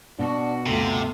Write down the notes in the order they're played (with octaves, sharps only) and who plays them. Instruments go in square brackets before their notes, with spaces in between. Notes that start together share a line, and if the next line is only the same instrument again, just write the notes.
[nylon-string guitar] B2 [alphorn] D4 [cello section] F#4
[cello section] D2 G2 F4 [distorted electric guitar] C3 [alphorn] A3